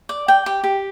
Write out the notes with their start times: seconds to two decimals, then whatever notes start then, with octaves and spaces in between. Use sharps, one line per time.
0.09 D5
0.28 G5
0.46 G4
0.64 G4